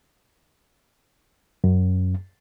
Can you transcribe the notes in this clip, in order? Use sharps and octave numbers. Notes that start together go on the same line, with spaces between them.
F#2